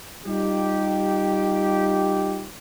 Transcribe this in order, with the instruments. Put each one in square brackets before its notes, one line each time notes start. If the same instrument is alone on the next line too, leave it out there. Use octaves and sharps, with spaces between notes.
[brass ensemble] G3 D#4 F4 G4